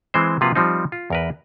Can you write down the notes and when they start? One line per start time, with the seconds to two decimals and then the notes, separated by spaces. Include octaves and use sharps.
0.14 E3 G#3 C4 C5
0.41 C3 F3 A#3 F4 F#4 B4
0.55 F3 G3 C4 D#4
0.92 F4
1.10 E2 A#4 B4